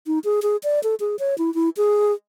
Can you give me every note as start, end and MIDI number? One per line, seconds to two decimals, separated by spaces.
0.07 0.19 63
0.24 0.40 68
0.42 0.57 68
0.64 0.82 74
0.83 0.95 69
1.00 1.16 68
1.19 1.37 73
1.38 1.53 64
1.55 1.69 64
1.77 2.12 68